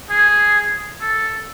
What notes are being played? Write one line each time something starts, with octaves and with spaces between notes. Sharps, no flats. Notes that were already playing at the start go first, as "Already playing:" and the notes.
G#4
A4